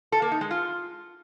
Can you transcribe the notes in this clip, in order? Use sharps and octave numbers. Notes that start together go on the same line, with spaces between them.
A4
A#3
D#4
G#3
F4